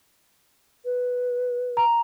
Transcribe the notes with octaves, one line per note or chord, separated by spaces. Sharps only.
B4
A#5